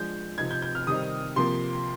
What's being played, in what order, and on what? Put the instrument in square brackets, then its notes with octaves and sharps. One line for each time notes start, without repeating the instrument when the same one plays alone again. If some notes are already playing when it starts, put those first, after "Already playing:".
Already playing: [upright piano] F3 G#3 D4 G6
C3 F3 C4 D#4 G#6
G6
G6
F6
C3 D#3 G3 C4 D#4 D#6
C3 F3 A#3 C6